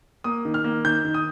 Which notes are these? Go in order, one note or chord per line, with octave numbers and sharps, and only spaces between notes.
A#3 D#6
D#3
F6
A#3
D#3 G6
D#3
D#6